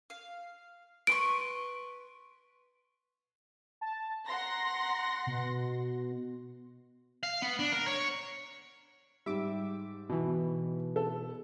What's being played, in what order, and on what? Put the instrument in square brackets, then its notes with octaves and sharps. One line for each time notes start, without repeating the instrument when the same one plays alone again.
[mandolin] F5
[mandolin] B4 C6 C#6 [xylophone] D7
[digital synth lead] A5
[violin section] F#5 C6 A#6 [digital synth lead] A#5
[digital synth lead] B2
[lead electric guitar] F5
B3
D4
A#4
C#5
[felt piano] G#2 G3 [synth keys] E5 D6
[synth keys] B2 E3
[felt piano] A4